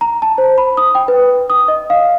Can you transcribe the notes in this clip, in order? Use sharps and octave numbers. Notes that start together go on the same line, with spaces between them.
A#5
A5
C5
B5
D#6
G5
B4
D#6
D#5
F5